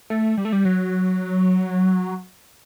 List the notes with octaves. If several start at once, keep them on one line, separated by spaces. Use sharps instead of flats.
A3
G3
A3
G3
F#3